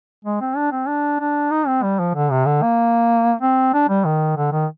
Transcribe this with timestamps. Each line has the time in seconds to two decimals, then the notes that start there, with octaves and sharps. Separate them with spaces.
0.25 G#3
0.41 C4
0.57 D4
0.72 C4
0.88 D4
1.20 D4
1.51 D#4
1.67 C4
1.83 G3
1.99 F3
2.15 D3
2.31 C3
2.46 D3
2.63 A#3
3.42 C4
3.74 D4
3.89 G3
4.05 D#3
4.37 D3
4.52 D#3